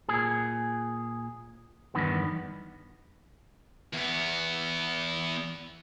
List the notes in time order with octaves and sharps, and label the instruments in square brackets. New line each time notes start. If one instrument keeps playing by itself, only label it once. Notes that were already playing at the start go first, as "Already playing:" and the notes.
[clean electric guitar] A#2 G#4
E2 G2 D#3 B3
[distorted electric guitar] E2 B3